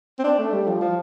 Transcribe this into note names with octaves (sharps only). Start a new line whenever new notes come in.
C4
D4
A3
G3
F3
F3